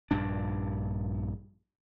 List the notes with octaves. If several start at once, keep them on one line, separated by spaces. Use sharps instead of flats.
A#1 G2 D4